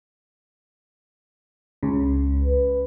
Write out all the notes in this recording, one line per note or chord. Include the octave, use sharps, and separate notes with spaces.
C#2 C#3
B4